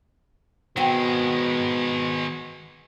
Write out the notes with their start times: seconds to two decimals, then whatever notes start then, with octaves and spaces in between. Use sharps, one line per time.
0.77 B2 D#3 G#3 C4 F#4